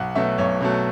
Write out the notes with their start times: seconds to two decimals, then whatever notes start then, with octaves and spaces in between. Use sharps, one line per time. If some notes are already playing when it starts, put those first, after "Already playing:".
Already playing: B1 F#5
0.15 B2 F#3 A3 E5
0.38 B1 C#5
0.61 B2 F#3 A3